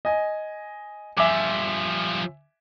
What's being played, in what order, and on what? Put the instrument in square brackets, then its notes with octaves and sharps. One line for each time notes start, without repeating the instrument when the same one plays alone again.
[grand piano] D#5 G#5
[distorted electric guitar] G2 F3 [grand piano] E5 G#5 D6